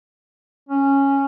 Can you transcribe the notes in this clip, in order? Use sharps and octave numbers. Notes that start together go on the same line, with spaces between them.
C#4